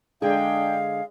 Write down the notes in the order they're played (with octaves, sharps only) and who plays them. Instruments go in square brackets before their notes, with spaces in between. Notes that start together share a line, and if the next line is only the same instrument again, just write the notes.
[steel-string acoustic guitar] D3 G#3 G#4 [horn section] D4 G5 [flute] F5